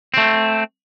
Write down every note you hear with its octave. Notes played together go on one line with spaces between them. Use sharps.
A3 C4